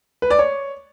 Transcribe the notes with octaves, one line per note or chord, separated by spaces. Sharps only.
B4
D5
C#5